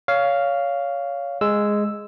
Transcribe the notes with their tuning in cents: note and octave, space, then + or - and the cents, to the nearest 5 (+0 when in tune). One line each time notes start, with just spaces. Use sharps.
C#5 +20 F5 -5
G#3 +0 E6 +0